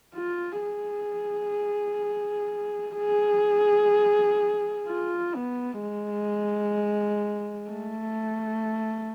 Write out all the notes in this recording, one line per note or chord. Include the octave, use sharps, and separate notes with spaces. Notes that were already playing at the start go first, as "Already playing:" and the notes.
F4
G#4
G#4
F4
B3
G#3
A3